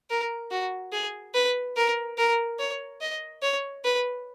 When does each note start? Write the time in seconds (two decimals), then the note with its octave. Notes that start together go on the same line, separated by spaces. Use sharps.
0.10 A#4
0.51 F#4
0.92 G#4
1.35 B4
1.77 A#4
2.18 A#4
2.59 C#5
3.01 D#5
3.42 C#5
3.84 B4